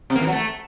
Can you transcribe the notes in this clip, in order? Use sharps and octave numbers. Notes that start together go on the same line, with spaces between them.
C3
A#3
E3
F#3
A3